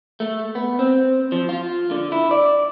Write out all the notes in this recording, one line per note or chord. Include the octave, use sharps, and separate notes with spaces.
A3
B3
C4
F3
F4
D3
E4
D5